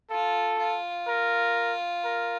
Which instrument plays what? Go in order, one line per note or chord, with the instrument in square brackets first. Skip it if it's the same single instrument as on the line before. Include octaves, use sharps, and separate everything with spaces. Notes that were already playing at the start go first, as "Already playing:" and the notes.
[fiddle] F4 [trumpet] A4
[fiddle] F4
[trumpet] A#4
A#4